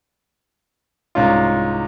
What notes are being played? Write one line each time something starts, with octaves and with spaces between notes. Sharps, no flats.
C2 G#2 C#4 F4